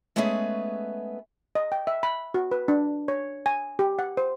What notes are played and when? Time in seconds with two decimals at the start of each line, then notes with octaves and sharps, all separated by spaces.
0.16 G#3 A3 B3 C#4 G#4 B4
1.55 D#5
1.72 G5
1.87 E5
2.03 B5
2.34 F#4
2.51 B4
2.68 D4
3.08 C#5
3.46 G#5
3.79 G4
3.99 F#5
4.17 C5